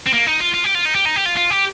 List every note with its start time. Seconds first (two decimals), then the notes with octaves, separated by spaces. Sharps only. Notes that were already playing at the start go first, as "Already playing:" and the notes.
0.06 C4
0.13 A#3
0.26 D#4
0.40 F4
0.54 F4
0.64 G4
0.75 F4
0.85 D#4
0.95 G4
1.05 D#4
1.16 G4
1.26 F4
1.37 F4
1.50 G4